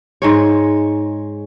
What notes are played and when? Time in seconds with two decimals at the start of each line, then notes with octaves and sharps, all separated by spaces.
0.22 G#2 G#3 C#5